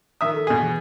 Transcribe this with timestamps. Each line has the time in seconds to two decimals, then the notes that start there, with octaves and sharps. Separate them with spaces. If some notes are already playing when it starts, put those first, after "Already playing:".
0.21 D#3 E5 A#5 D#6
0.34 A4
0.47 B2 G#4
0.63 E3